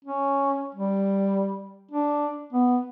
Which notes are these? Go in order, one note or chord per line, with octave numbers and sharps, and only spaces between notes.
C#4
G3
D4
B3